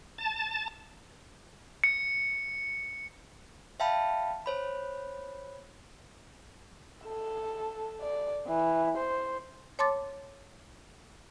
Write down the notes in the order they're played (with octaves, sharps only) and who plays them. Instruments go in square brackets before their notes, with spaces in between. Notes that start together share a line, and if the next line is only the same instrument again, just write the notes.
[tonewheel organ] A5
[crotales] C#7
[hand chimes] E5 F5 G5 A5 B5
C5 C#5 B5
[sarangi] A4
D5
E3
C5
[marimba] C#5 A5 C6 D6 A6